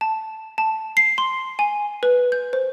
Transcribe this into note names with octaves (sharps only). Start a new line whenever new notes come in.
A5
A5
C7
C6
G#5
B4
G6
C5